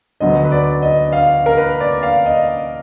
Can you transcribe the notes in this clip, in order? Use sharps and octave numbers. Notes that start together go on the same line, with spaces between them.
D2 D3 F#3 B3 D#5
B4
D5
D#5
F5
A#4
B4
D5
F5
D#5